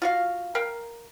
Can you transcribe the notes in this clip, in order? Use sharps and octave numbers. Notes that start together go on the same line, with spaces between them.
F4 F#4 F5
A#4 F5 G5